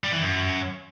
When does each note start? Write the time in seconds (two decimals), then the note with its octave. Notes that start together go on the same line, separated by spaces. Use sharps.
0.04 G3
0.13 E3
0.21 F#2